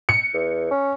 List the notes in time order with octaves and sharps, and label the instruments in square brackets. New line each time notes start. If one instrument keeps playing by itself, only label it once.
[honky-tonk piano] C#7
[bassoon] E2
C#4